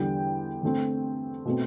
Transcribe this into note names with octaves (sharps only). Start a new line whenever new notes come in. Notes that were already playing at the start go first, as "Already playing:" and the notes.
Already playing: E2 D3 G3 G5
D3 A3 C4
B2 A3 C4